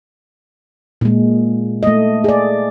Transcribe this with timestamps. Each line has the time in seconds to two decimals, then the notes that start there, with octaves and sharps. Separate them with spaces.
1.01 A#2 G#3
1.83 A3 D#5
2.24 G#4 D5